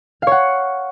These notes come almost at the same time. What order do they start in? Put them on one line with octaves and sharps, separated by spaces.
F5 C#5 F#5